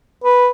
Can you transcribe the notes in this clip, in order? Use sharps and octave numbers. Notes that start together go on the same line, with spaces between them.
B4